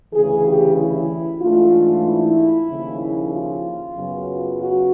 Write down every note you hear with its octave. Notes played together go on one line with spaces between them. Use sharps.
D2 C#3 E3 G#4
G4
E4
G#2 E3 A3 D4 F4
E4
D#2 C#3 F3
F4
F#2 C#3 F#3 B3
F#4